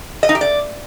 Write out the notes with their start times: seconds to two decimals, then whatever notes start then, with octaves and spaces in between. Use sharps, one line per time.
0.23 D#5
0.29 D#4
0.35 G4
0.41 D5